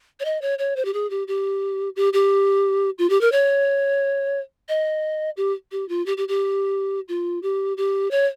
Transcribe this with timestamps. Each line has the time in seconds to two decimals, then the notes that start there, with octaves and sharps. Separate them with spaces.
0.20 C#5
0.25 D#5
0.42 C#5
0.59 C#5
0.76 C5
0.85 G4
0.94 G#4
1.10 G4
1.28 G4
1.96 G4
2.13 G4
2.98 F4
3.10 G4
3.21 A#4
3.32 C#5
4.69 D#5
5.37 G4
5.72 G4
5.89 F4
6.06 G4
6.17 G4
6.28 G4
7.08 F4
7.43 G4
7.77 G4
8.11 C#5